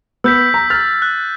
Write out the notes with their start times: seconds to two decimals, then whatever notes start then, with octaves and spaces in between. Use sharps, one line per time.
0.24 B3 E6 G6 B6
0.54 A#5
0.70 F6 A6
1.02 F#6